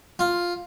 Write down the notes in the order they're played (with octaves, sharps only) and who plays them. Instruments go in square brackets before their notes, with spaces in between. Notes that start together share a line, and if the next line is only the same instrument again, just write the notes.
[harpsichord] F4